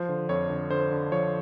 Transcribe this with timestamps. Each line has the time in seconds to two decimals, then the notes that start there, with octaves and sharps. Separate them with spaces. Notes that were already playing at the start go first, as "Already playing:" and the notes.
Already playing: F3 C5
0.09 D3
0.29 F2 C#5
0.50 D3
0.70 D3 C5
0.91 D3
1.12 F3 C#5